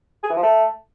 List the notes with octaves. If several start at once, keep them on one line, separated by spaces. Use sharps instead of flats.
G#4
E3
F3
A3